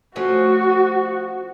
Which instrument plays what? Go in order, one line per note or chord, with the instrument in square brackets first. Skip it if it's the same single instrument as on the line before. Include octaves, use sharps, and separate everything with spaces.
[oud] F3 A3 C#4 [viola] F#4